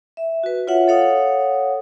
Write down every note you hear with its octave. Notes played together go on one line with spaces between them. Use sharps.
E5
F#4 B4
F4 C#5 E5 F#5
A4 C#5 F5 F#5 D#6